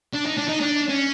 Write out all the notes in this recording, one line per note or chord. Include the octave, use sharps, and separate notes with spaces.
D4
D#4
D4
D#4
D4
C#4